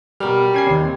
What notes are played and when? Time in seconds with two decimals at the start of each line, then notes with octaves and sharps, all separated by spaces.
0.20 B2 G3 A#4 F6
0.54 C#4 G#6 C7
0.67 D#2 C3